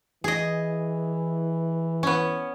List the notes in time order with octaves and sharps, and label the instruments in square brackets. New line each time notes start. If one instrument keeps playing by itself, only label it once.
[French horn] E3 [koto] G#4 D#5
[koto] B3 C#4